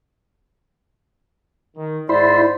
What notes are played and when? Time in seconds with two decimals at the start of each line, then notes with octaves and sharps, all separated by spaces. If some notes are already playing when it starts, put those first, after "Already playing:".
1.76 D#3
2.09 G#2 E4 C5 D5 B5 C6